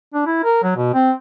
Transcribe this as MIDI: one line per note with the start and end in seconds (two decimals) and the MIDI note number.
0.14 0.24 62
0.26 0.43 64
0.44 0.59 70
0.63 0.73 54
0.76 0.90 47
0.94 1.11 60